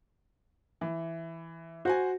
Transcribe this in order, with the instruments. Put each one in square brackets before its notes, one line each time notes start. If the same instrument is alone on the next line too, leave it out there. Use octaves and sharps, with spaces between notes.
[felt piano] E3
[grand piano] F#4 [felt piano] C5 F#5 G#5